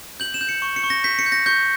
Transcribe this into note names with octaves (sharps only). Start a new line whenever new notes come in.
G6 F#7
E7
G6
C#7
C#6
C#7
C#6
A#6
G6 B6
C#7
G6
A#6
C#6 G6